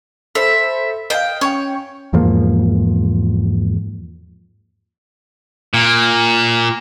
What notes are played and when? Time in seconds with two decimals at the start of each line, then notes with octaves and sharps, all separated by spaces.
0.35 A4 C5 E5 B5
1.10 D#5 F5 G5
1.41 C#4 C#5 G5
2.13 E2 G#2 F3 A#3
5.74 A#2